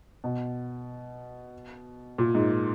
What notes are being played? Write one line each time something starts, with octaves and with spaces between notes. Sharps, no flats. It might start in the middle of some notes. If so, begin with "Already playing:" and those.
B2
A#2
G#2